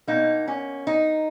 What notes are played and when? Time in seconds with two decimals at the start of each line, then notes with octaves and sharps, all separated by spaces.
0.07 B2 A#3 D#4
0.48 C#4
0.87 D#4